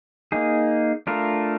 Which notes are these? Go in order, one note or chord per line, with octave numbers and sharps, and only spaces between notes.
A#3 D#4 G#4
A3 D4 F4 A#4